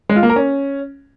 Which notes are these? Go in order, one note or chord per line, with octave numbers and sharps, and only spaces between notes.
G#3
F4
A#3
A#4
C#4